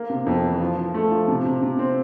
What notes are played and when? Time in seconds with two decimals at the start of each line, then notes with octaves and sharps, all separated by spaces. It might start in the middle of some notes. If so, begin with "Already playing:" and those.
Already playing: A#3
0.10 C3
0.26 F2
0.43 E3
0.60 F3
0.77 F3
0.94 A3
1.11 F3
1.28 C3
1.45 C3
1.62 C3
1.79 C4